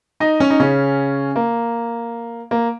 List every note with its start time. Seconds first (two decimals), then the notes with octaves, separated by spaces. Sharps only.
0.20 D#4 D#5
0.40 C#4 C#5
0.50 D#4
0.60 C#3 C#4
1.36 A#3
2.51 A#3